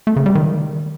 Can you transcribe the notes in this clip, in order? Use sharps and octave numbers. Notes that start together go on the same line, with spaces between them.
A3
C#3
G3
D#3